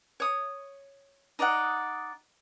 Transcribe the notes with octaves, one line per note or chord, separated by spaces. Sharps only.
C#5 D#6
D#4 D5 D#5 F#5